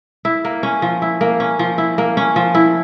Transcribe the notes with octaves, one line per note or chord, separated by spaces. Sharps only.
E4
A#3
C#4
F3
E4
A#3
C#4
F3
E4
A#3
C#4
F3
E4